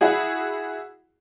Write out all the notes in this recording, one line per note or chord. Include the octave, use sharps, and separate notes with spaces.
E4 F#4 G#4